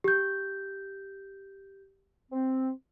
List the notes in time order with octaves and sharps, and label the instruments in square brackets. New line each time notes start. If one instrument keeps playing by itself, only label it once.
[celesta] G4 G6
[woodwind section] C4